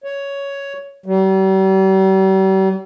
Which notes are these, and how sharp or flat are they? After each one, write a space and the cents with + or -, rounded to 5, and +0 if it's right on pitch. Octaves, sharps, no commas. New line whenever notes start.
C#5 +10
G3 -40